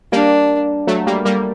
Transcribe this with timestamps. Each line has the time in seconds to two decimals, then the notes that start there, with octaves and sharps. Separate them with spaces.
0.12 G3 A#3 D4
0.87 F#3 A3
1.07 G3 A#3
1.25 G3 A#3